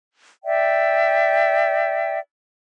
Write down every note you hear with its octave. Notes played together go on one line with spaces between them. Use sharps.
D5 E5 G5